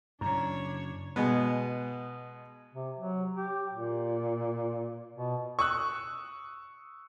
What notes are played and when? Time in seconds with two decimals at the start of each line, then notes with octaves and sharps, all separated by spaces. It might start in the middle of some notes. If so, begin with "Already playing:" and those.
0.21 F#2 C#3 D4 E4 C#5
1.16 B2 G#3 B3
2.74 C3
2.98 F#3
3.36 G4
3.73 A#2
5.16 B2
5.59 C#6 D#6 E6 F#6